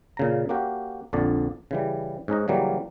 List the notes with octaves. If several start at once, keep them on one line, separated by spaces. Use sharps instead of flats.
A#2 C#3 A#5
A#3 C#4 F#4 G4
A#1 F2 D3 D5
C#3 E3 G3
G#2 C#4 D#4 D#5
C#3 E3 F#3 G3 A#3